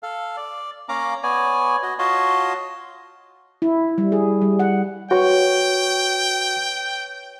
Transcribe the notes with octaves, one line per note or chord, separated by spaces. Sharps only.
A4 F5
D5
A#3 C#4 F5 A#5 D6
B3 C#5 D5 G#5
F#4 D#5
F4 F#4 C#5 D#5 A5 C6
E4
G3
G#4
G3
F#5
F#4 B4 C#5 G5 C#6